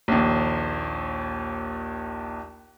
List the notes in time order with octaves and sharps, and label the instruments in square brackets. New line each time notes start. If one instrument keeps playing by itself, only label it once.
[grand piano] A#1 D#2